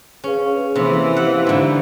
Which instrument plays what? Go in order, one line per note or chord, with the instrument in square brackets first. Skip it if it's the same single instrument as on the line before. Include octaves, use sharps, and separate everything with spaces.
[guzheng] C#4 [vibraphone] G#4 B4 F5
[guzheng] C3 [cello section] E3 [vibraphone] A#3 A4 C6
[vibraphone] G4 B4 F5 [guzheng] F#5
[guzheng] G#2 D3